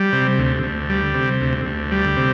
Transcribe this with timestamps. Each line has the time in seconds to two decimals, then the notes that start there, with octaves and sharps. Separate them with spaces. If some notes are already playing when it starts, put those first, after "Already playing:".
Already playing: G3
0.13 C3
0.38 D2
0.63 D2
0.89 G3
1.14 C3
1.41 D2
1.65 D2
1.92 G3
2.16 C3